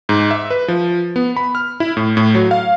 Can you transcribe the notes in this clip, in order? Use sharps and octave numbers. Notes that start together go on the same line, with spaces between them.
G#2
E5
B4
F3
B3
B5
F6
E4
A2
A2
F#3
F5